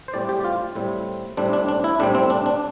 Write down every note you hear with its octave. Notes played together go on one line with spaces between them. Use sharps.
C5
A2 G3 C4 D5
G4
F4
A2 G3 C4
A2 G3 C4 D4
D4
D4
E4
A2 G3 C4 D4
C4
D4
D4